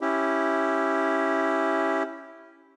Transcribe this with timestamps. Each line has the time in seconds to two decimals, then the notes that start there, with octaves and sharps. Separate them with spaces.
0.01 C#4 E4 G4